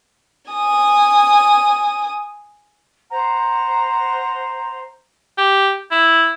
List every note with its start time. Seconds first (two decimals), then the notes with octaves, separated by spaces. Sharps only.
0.51 G#5 D#6
3.09 C5 F#5 A#5
5.38 G4
5.91 E4